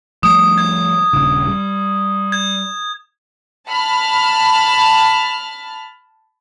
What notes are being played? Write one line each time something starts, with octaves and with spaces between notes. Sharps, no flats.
F3 G3 A3 D#6
G#6
D#1 G2 C#3
G3
G#6
A5 B5 F6